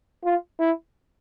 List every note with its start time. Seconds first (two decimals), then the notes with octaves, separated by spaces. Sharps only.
0.24 F4
0.60 E4